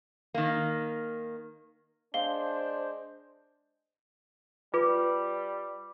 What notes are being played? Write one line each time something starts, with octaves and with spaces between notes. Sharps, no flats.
D#3 A#3
G#3 D4 C5 F5 G7
G3 F4 G#4 B4 D6